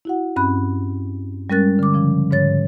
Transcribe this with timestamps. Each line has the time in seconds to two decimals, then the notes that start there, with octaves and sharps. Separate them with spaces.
0.05 E4 F#4 F#5
0.36 G2 C4 C#4 B5 F#6
1.50 G3 G#3 C#4 A#4 F#6 A6
1.79 D3 D6
1.94 C#3 F3 C#4
2.31 G#2 D3 C#5 A6